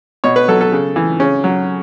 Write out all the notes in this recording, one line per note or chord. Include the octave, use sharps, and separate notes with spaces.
B2 C#5
B4
F#3 A4
A4
C#3
E3
C#3 C#4
F#3